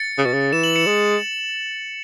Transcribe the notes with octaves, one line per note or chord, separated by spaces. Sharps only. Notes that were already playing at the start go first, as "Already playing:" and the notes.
Already playing: A6 C#7
C#3
B2
C#3
E3 E7
F#7
C#7 E7
G#3